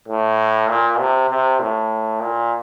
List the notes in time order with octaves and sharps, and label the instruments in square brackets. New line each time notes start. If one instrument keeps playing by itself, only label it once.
[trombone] A2
A#2
C3
C3
A2
A#2